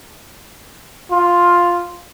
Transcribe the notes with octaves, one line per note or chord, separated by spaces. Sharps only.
F4